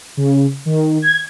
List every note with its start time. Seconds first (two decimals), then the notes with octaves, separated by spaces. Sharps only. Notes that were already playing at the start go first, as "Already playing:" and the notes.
0.17 C#3
0.65 D#3
1.02 G#6